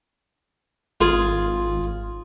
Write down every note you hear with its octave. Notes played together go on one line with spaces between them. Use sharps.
G#1 F4 G#4